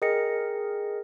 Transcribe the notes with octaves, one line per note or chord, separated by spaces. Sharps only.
G#4 A#4 D#5 G5 A#6 C#7